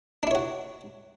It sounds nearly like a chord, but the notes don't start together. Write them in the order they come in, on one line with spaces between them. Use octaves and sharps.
D4 E4 C#5 F#4